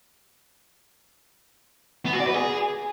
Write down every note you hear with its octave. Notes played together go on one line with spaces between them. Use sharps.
B3
F#4
D5
B4
G#4